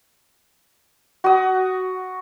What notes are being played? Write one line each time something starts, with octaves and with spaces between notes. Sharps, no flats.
F#4 D#6